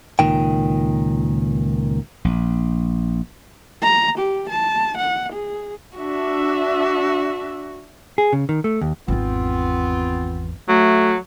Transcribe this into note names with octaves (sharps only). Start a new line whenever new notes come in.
C#2 A#2 D#3 G5
A#1
A#5
G4
A5
F#5
G#4
D4 F#4 E5
G#4
C#3
D#3
A3
D#2
G#1 E2 B3 C4 F4
F#3 A3